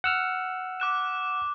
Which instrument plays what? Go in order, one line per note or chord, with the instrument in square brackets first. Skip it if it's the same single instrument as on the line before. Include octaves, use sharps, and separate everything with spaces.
[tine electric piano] F#5 E6 F6
[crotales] D6 F#6 E7